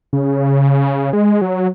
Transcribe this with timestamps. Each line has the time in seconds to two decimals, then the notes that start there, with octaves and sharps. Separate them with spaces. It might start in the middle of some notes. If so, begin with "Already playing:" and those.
0.13 C#3
1.13 G#3
1.41 F#3